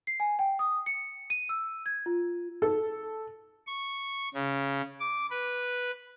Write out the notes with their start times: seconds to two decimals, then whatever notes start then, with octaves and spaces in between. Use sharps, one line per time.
0.07 C7
0.20 G#5
0.39 G5
0.59 D#6
0.86 C#7
1.30 D#7
1.49 E6
1.86 G#6
2.06 F4
2.62 A4
3.67 C#6
4.34 C#3
5.00 D6
5.31 B4